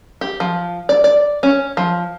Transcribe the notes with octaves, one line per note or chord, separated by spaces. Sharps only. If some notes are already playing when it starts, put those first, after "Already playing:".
G4
F3
D5
D5
C#4
F3